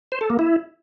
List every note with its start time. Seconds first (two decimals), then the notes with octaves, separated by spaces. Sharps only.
0.12 C5
0.21 A4
0.30 A#3
0.39 E4